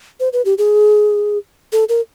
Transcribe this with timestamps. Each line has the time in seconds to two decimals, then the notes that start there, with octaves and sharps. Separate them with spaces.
0.20 C5
0.33 B4
0.45 G4
0.58 G#4
1.73 A4
1.89 A#4